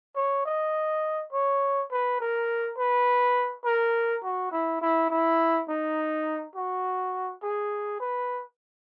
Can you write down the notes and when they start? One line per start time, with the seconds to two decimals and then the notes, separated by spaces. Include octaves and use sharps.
0.16 C#5
0.46 D#5
1.33 C#5
1.91 B4
2.20 A#4
2.78 B4
3.65 A#4
4.23 F#4
4.51 E4
4.81 E4
5.10 E4
5.69 D#4
6.56 F#4
7.43 G#4
8.00 B4